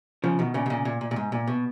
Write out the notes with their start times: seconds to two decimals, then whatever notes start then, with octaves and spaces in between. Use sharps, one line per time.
0.24 C#3 F3
0.39 B2 D#3
0.54 A#2 C#3
0.66 B2
0.70 A#2 C#3
0.85 A#2
1.01 A#2
1.11 A#2
1.16 G#2
1.32 A#2
1.48 B2